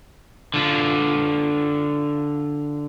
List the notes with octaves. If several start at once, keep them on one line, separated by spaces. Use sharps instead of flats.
D3 F4